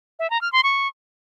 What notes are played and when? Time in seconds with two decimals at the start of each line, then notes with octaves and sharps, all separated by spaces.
0.19 E5
0.30 A#5
0.41 F6
0.52 C6
0.64 C#6